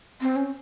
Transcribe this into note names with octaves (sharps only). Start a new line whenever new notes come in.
C4
C#4